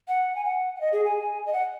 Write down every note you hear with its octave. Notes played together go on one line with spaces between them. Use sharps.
F#5
G#5
F#5
F#5
D#5
G#4
G#5
D#5
F#5